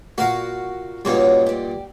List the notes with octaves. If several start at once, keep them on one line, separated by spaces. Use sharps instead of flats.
A#2 F#4 A#4 F5
G2 A#2 C#3 C#4 D#4 F#4
G4 D5